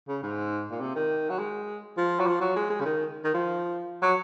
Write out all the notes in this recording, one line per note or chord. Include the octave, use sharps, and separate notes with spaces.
C#3
G#2
A#2
C3
D#3
F#3
G#3
F3
F#3
F3
F#3
G#3
G#3
C#3
D#3
D#3
F3
F#3